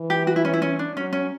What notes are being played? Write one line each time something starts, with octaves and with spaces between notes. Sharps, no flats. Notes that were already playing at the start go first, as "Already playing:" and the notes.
Already playing: E3
G4
F#4
E4
C#4
E4
C#4
D4
F#3 C#4
C#4